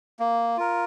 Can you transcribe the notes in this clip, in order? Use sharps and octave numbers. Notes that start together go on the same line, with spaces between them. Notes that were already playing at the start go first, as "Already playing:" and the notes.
A#3
F4 A#4